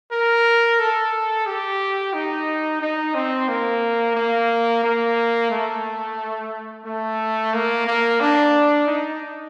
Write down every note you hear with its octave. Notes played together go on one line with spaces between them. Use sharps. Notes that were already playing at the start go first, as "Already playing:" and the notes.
A#4
A4
G4
D#4
D#4
C4
A#3
A#3
A#3
A3
A3
A#3
A#3
D4
D#4